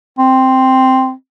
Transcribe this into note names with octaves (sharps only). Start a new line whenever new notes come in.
C4